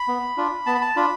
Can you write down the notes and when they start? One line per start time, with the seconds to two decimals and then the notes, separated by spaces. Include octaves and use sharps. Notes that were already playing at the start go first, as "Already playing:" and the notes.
Already playing: B5
0.08 B3
0.37 D4 F4
0.66 B3 A5
0.75 B5
0.81 A5
0.96 D4 F4 B5